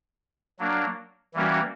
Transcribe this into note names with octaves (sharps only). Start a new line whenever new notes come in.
F#3 A#3 D4
E3 G3 A#3 C#4 F#4